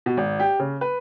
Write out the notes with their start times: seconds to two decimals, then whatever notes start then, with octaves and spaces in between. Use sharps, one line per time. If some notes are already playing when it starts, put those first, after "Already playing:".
0.06 B2
0.17 G#1
0.40 G4
0.59 C#3
0.81 B4